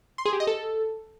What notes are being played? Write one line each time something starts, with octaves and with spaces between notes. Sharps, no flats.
C6
G#4
G4
D#5
A4